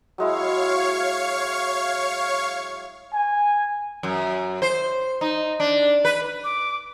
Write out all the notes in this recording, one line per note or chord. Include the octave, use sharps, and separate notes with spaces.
F#3 G#3 E4 C#5 F5 C#6
G#5
F#2
C5
D#4
D4
B4
D6